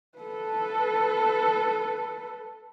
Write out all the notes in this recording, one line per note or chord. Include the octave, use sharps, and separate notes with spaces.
A4 B4